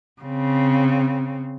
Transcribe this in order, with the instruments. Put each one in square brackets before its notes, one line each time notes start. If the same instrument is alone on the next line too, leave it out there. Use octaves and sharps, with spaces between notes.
[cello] C#3 C4